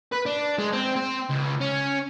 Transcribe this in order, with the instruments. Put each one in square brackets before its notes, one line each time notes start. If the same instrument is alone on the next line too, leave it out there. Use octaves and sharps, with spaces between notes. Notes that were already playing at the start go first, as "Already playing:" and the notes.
[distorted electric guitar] B4
D4
G#3
C4
C4
C#2
C#4